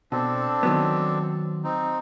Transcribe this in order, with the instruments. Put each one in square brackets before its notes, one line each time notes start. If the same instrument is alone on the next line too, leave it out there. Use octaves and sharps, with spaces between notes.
[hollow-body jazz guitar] B2 [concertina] C4 D4 A4
[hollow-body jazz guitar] D#3 F#3 B3
[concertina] C4 D#4